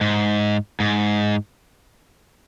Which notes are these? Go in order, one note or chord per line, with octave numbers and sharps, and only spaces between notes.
G#2
G#2